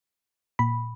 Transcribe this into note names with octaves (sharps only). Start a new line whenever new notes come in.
A#2 B5